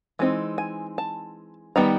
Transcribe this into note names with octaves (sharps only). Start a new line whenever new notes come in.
E3 G#3 C4 D#4
G#5
A5
D#3 G3 B3 D#4 A#5